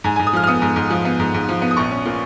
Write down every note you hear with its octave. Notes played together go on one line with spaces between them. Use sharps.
G#2 G#5
G#2 G#5
D#6
F3 F6
F6
B3 D#6
G#2
G#2
F3
B3
G#2
G#2
F3
B3
D#6
A#1 C#6
C#4
A#2